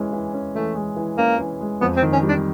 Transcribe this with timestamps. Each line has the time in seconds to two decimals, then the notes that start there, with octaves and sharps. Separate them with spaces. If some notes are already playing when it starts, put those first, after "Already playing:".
Already playing: E3 G#3 C#4
0.13 E3
0.34 C#4
0.55 E3 A3
0.75 G#3
0.96 E3
1.18 A#3 C#4
1.38 E3
1.61 G#3
1.81 F2 B3
1.97 C4
2.02 D#3
2.13 C#4
2.23 G3
2.29 D4